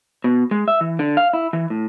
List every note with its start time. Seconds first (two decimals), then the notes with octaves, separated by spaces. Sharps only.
0.24 B2
0.51 G#3
0.68 E5
0.81 E3
0.99 D3
1.17 F5
1.33 E4
1.53 E3
1.70 A2